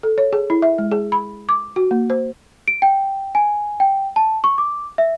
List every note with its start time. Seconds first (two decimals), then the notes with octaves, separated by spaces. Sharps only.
0.03 A4
0.18 C#5
0.33 G#4
0.50 E4
0.62 E5
0.78 G#3
0.92 G#4
1.12 B5
1.49 D6
1.76 F#4
1.91 A#3
2.10 C5
2.68 D7
2.82 G5
3.35 G#5
3.80 G5
4.16 A5
4.44 C#6
4.58 D6
4.98 E5